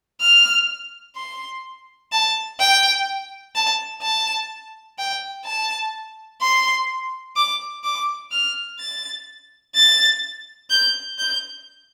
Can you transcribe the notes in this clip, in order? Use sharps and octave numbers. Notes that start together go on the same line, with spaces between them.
F6
C6
A5
G5
A5
A5
G5
A5
C6
D6
D6
F6
A6
A6
G6
G6